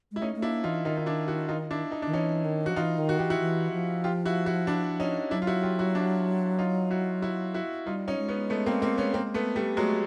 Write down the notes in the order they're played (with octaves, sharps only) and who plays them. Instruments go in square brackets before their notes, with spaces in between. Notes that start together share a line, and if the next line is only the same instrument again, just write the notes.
[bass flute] G#3 [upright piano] E4
[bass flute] A3 [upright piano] C#4 D#4
[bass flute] A3
[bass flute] A#3 [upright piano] D4 E4
[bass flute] E3 [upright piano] D#4 F4
[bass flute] D#3 [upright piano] D#4 F4
[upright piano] D#4
D4 E4
E4 F#4
D#4 F4
D4 E4
D#4
[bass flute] D#3 [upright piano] D4
[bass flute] E3 [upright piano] C#4 D#4
[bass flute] D#3
[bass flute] F3 [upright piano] F#4
[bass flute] E3 [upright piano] D#4 F4
[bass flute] D#3
[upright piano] F#4
[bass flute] E3 [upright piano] G4
[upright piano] E4 F#4
[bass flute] E3
F3
[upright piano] F4 G4
E4 F#4
E4 F#4
D4 E4
C#4 D#4
[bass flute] F#3 [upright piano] D4 E4
[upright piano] F4
E4 F#4
F4 G4
E4 F#4
D4 E4
D#4 F4
E4 F#4
E4 F#4
E4 F#4
[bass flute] G3 [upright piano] D#4 F4
[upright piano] C#4 D#4
[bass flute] G#3
[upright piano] B3 C#4
A3 B3
A#3 C4
A#3 C4
B3 C#4
A#3 C4
A3 B3
G3 A3
[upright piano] F#3 G#3 [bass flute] A3